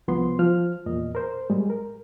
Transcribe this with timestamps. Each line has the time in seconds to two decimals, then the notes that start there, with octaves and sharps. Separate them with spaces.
0.08 C2 F3 B3 C6
0.39 F3 F6
0.86 E2 A#2 D#5
1.15 A#4 C5
1.50 A2 G3 G#3
1.70 A#4